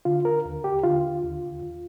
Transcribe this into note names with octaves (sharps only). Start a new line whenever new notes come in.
D3 F4
A#4
D#2
G4
D3 F4
D#2
D#2